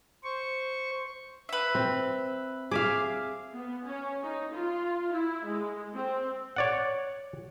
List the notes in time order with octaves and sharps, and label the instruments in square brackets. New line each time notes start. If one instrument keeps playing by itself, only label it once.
[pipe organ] C5 C#6
[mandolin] B4 E5
[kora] C4
[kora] G#4 E5 F5 [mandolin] D6 F6
[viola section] B3
C#4
D#4
F4
E4
G#3
C4
[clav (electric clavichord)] C#5 D5 F#5